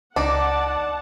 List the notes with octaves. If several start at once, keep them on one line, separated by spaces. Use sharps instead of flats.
C#2 D4 D#4 D5 F#5 A5 D6